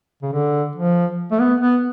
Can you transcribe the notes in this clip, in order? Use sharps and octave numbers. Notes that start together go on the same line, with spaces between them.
C#3
D3
F3
A3
B3
B3